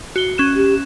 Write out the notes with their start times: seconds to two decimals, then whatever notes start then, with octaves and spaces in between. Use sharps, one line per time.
0.16 F#4 G7
0.38 C#4 F#6 E7
0.56 G4